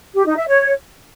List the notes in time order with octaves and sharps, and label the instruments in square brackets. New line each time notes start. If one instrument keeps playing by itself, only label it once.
[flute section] G4
D#4
E5
C#5